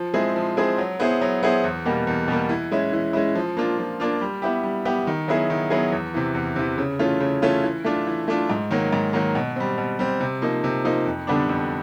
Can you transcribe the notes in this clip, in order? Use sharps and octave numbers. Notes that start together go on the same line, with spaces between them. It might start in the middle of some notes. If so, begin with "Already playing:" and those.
Already playing: F3
G#3 C4 E4 G#4
F3
G#3 C4 E4 G#4
F#3
B3 E4 G#4 C5
F#3
B3 E4 G#4 C5
E2
B2 G3 A#3
E2
B2 G3 A#3
E3
G#3 C#4 E4
E3
G#3 C#4 E4
F3
A#3 D4 F4
F3
A#3 D4 F4
G3
B3 E4 G4
G3
B3 E4 G4
D#3
F#3 B3 E4 G#4
D#3
F#3 B3 E4 G#4
E2
C3 E3
E2
C3 E3
C#3
E3 A3 C#4 F4
C#3
E3 A3 C#4 F4
E3
A3 D4 F4
E3
A3 D4 F4
G#2
D#3 F#3 A#3
G#2
D#3 F#3 A#3
B2
G3 C4
B2
G3 C4
C3
F3 A#3 D#4
C3
F3 A#3 D#4
F2
D3 G3 B3 D4
F2